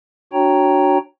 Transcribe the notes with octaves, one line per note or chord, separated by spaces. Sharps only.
D4 F#4 C#5 G5 A#5